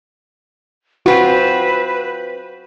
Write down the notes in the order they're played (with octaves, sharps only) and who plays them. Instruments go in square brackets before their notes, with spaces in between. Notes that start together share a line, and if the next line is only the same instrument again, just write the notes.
[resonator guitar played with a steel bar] C4 F4 [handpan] F#4 [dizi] B4